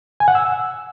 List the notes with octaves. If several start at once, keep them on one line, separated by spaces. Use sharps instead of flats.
G#5
F#5
E6